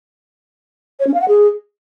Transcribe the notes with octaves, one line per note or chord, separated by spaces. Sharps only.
C#5
C#4
F5
F#5
G#4